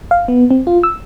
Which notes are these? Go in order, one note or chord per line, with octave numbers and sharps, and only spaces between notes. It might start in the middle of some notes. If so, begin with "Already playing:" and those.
F5
B3
C4
F4
E6